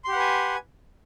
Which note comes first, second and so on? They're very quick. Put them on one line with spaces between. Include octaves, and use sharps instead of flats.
C6 G4 F#5 B4 G#5